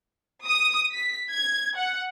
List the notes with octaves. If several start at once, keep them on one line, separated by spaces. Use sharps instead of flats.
D#6
B6
G#6
F#5